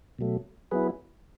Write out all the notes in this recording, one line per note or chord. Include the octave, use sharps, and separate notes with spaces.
B2 F#3 A3
F#3 B3 E4 G#4 B4